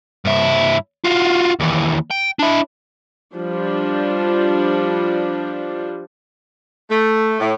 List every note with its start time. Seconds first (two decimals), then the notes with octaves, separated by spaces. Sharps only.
0.25 G2 E4
1.05 F4 F#4
1.60 D#2 E3
2.10 G5
2.39 D4 E4
3.35 F3 G3 D4
6.90 A3
7.40 A2